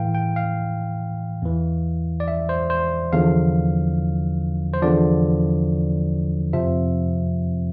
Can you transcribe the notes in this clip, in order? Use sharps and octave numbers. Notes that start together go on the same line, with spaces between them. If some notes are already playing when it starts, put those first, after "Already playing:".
Already playing: A2 E3 F5 G5
G5
F5
E2 E3
D5
E5
C5
C5
E2 D3 F3 F5
C5
E2 D3 F3 D5
F2 C3 F3 E5